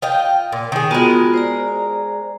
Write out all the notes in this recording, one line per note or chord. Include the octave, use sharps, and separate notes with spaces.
F4 D#5 G5
A#2
D#3 G#4
G#3 B3 F4 F#4 A#4
C5 D5 A#5